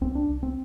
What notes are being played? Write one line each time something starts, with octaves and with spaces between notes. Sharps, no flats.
C2 C4
D4
C2
C4